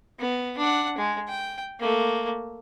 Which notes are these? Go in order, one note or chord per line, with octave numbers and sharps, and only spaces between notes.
B3
D4 F#5
G#3
G5
A3 A#3